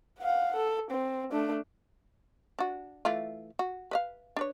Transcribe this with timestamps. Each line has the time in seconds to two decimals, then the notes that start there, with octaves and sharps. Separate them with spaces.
0.19 F5 F#5
0.56 A4
0.91 C4
1.32 A3 D4
2.59 D4 F#4
3.05 E3 A3 F4
3.59 F#4
3.91 B4 D#5 F5
4.36 D4 B4 C#5